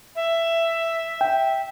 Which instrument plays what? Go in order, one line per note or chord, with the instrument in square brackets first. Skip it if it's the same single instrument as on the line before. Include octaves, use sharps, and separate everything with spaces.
[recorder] E5
[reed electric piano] G5